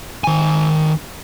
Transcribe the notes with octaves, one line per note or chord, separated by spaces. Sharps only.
D#3 G#5